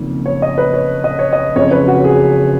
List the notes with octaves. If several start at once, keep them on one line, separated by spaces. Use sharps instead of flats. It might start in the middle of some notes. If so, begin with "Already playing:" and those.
Already playing: F#1 F2 D#3 A#3
C#5
D#5
B4
C#5
D#5
C#5
D#5
F#1 F2 C#3 C#5
B4
F#4
G#4